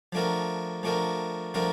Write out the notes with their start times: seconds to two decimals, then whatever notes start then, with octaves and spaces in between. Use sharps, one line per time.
0.12 F3 A3 D4 F#4 A#4
0.83 F3 A3 D4 F#4 A#4
1.54 F3 A3 D4 F#4 A#4